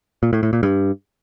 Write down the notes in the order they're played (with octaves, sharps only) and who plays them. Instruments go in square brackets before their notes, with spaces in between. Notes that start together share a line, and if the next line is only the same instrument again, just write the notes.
[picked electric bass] A#2
A2
A2
A#2
G2